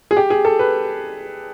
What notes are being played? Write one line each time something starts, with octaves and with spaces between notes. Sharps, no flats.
G#4
G4
G#4
A4
B4